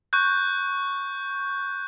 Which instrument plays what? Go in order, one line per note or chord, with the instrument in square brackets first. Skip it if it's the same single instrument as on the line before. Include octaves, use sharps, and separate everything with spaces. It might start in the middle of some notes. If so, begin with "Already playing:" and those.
[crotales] C#6 F#6 G6